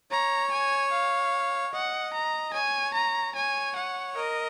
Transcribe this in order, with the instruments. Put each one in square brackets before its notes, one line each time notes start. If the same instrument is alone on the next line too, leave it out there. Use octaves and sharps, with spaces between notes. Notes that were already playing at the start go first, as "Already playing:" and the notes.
[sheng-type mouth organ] C#5 [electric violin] A#5
[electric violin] G#5
F5
[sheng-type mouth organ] D#5 [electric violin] F#5
[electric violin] A#5
[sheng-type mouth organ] C#5 [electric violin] G#5
[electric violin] A#5
[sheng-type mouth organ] C#5 [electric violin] G#5
[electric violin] F#5
[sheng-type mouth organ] A#4 [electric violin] D#5